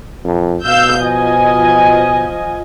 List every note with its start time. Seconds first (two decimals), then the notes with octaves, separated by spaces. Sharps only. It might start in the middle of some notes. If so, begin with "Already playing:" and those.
0.25 F2
0.65 B2 F5 E6 G6
1.01 F3 D#5 G#5